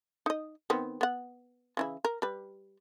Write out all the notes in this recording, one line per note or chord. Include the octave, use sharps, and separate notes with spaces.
D#4 D#5
D#3 B3 C4
B3 F#5
C#3 E3 E4
A#4
G3 B4